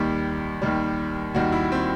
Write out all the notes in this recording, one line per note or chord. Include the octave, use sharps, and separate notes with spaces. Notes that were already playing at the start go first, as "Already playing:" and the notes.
Already playing: D#2 D#3 G3 G4
D#2 D#3 G3
D#2 D#3 G3 F#4
E4
C4